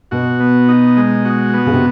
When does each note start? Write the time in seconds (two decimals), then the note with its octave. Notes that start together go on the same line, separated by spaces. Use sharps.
0.11 B2 F#4
0.40 B3
0.68 D#4
0.97 G#3
1.25 F#4
1.54 B3
1.66 C#3
1.74 C3